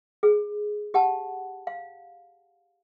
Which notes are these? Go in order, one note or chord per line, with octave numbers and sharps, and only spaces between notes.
G#4
G4 F#5 A5
F5